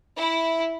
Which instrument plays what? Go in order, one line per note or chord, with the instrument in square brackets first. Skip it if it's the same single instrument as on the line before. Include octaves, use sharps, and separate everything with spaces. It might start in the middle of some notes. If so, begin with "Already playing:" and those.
[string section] E4